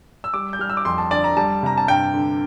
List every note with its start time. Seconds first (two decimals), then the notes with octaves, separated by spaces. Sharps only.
0.24 E6
0.34 G3 D6
0.53 G6
0.59 G3 F6
0.69 E6
0.77 D6
0.85 F2 C6
0.98 A5
1.11 D3 D5
1.24 A#5
1.37 G3 A5
1.63 C3 A#5
1.77 A5
1.88 G2 G5
2.14 D3